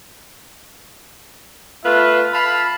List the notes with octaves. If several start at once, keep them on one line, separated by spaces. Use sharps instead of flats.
A3 F4 B4 E5 F5
F5 A5 B5